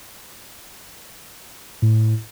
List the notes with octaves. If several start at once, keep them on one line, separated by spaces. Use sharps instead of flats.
A2